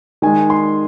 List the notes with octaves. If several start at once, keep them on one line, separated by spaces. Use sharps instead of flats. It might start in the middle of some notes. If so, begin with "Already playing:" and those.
D#3 G#3 G#5
C6